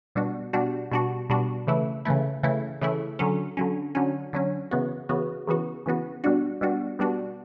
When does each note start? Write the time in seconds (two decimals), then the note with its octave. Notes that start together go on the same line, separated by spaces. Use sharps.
0.15 B2 G3 D4 F#4
0.53 B2 G3 D4 F#4
0.91 B2 G3 D4 F#4
1.30 B2 G3 D4 F#4
1.67 C#3 E3 A3 E4
2.05 C#3 E3 A3 E4
2.43 C#3 E3 A3 E4
2.81 C#3 E3 A3 E4
3.19 D3 F#3 C#4
3.57 D3 F#3 C#4
3.95 D3 F#3 C#4
4.33 D3 F#3 C#4
4.71 C#3 E3 B3 F#4
5.09 C#3 E3 B3 F#4
5.47 C#3 E3 B3 F#4
5.86 C#3 E3 B3 F#4
6.24 B2 G3 D4 F#4
6.61 B2 G3 D4 F#4
6.99 B2 G3 D4 F#4